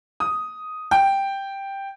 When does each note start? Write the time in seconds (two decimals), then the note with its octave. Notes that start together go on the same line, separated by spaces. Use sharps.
0.20 D#6
0.91 G5